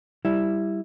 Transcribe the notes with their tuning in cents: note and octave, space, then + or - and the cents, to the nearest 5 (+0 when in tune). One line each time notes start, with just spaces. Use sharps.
G3 +0 E4 +0